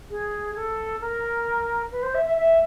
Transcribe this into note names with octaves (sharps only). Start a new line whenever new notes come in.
G#4
A4
A#4
B4
C5
E5
E5
E5